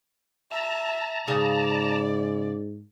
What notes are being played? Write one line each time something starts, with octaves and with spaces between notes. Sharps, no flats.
E5 A5 A#5
G#2 C#3 G#4 D5